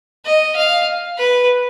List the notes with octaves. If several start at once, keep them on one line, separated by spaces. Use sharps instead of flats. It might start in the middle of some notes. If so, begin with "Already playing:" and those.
D#5
F5
B4